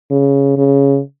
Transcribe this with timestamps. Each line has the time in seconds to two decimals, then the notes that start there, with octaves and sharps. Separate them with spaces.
0.11 C#3
0.57 C#3